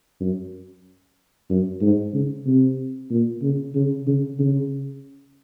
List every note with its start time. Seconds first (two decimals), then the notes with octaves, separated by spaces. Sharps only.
0.21 F#2
1.50 F#2
1.81 G#2
2.14 C#3
2.46 C3
3.10 A#2
3.42 C#3
3.75 C#3
4.07 C#3
4.39 C#3